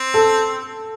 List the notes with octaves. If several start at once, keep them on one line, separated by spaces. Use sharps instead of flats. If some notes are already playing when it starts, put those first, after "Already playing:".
Already playing: C4
A4